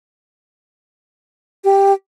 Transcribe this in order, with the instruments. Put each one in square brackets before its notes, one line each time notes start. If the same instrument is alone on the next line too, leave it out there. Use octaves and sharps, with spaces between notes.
[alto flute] G4